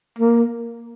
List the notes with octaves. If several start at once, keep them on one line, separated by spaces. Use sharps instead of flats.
A#3